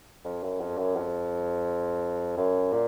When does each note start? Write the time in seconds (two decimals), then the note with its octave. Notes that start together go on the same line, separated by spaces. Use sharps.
0.25 F2
0.43 F#2
0.60 F2
0.78 F#2
0.96 F2
2.37 F#2
2.73 A#2